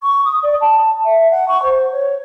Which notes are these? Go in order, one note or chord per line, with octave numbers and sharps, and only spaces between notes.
C#6
D#6
D5
A5
E5
F#5
C#6
C5
C#5